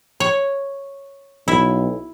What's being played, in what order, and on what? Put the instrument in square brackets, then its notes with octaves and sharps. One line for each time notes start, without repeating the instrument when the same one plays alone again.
[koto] C#5
[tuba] B1 [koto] E4